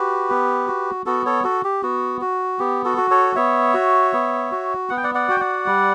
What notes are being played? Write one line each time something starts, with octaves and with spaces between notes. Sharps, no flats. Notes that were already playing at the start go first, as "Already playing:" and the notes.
Already playing: F#4 G4 B4
B3
F#4
B3 F#4 A4
A4 C#5
F#4 A4
G4
B3 F#4
F#4
B3 G4
F#4 A4
F#4
A4 C#5
B3 C#5 E5
F#4
B3
F#4
B3 F#5
G5
D5 F#5
D5 F#5
F#4 G5
D5 F#5
G3